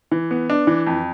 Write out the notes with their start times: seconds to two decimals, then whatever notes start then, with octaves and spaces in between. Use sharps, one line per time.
0.11 E3
0.31 B3
0.50 D4
0.67 E3
0.87 F2